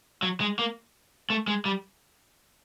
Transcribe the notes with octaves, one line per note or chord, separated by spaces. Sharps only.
F#3
G#3
A#3
A3
G#3
G3